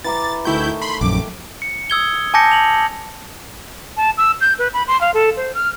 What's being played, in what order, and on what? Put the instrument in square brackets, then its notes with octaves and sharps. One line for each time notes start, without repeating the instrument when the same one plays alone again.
[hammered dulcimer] E3 A#5 D6 [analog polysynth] A6
[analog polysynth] D2 E4 G6 [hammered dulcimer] D#3 A3 C#6
[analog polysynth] B5 C6
[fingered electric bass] A#1 F#2 [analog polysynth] D6
[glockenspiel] C#7
D#6 E6 G#6 G7
G#5 A5 D6 G6 A#6 C#7
F7 F#7
[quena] A5
E6
G6
B4
B5
C6
F5
A4
C5
F6